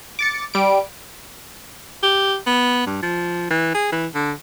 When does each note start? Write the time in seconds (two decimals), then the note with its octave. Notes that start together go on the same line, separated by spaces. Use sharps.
0.19 D6 A6 C#7
0.54 G3 D7
2.03 G4
2.46 B3
2.86 G2
3.02 F3
3.50 E3
3.75 G#4
3.92 E3
4.15 D3